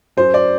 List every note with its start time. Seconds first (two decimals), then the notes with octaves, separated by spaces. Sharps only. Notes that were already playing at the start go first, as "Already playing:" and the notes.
0.17 F#2 F#3 C5
0.34 D5